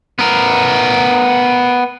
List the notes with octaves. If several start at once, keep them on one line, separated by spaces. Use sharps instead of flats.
B3 A#4